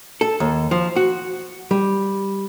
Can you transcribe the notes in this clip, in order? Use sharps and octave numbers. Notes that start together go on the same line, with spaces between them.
A4
D#2
F3
F#4
G3